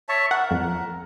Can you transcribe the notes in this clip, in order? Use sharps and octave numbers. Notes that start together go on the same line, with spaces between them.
C#5 E5 A5
A#4 F#5
F2